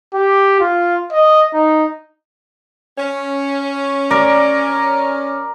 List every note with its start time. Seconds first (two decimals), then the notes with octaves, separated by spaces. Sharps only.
0.14 G4
0.60 F4
1.12 D#5
1.54 D#4
2.98 C#4
4.11 A#4 D5